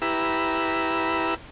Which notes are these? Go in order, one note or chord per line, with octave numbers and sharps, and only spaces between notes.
E4 G4 B4 A#5 E6